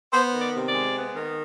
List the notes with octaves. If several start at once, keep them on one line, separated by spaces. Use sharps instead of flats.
B3 C5
D#3
D5
C3
D5
G#3
B3
D#3